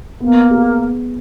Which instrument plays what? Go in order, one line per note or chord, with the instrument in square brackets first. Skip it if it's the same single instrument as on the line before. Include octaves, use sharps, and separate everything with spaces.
[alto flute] A#3 [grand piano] B3
[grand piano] G#4